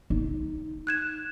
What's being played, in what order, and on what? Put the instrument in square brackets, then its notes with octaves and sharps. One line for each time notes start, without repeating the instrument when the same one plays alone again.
[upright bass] D#4
[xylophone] F#6 G#6 E7